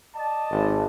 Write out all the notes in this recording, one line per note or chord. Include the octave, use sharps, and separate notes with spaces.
D5 D#5 A5
G#1